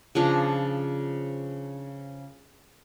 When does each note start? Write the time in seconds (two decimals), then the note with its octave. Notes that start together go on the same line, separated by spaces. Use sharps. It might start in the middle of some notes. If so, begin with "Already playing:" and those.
0.15 C#3 F3 D4 A#5